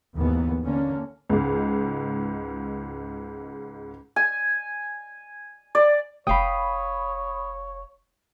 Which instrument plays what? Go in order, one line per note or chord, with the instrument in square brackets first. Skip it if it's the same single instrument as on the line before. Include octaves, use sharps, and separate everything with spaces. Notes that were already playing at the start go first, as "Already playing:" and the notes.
[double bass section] D#2 G#2 E3 B3
D3 A#3 C#4
[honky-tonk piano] C#2 G#2
[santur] G#5
D5
[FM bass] F1 [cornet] C#5 [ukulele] F5 G5 [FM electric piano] B5 D#6